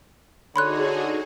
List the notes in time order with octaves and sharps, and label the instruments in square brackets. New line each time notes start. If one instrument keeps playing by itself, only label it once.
[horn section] D3 C#5 [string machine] D#4 F#4 G#4 [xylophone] B5 C6 F#6